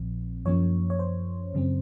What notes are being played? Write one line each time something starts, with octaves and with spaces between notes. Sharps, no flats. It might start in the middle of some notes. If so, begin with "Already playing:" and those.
Already playing: A#1 A#2 F3 C4
F#2 F3 A#3 C#4 C#5
C#5
C5
F#2 C#3 F#3 C4